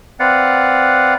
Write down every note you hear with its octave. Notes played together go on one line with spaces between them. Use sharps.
C4 B4 D5 F5 F#5